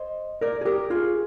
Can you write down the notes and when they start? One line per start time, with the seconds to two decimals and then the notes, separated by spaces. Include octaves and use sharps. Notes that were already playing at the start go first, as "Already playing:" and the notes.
Already playing: C5 D#5
0.41 A#4 D5
0.61 G#4
0.65 G4 A#4
0.90 F4 G#4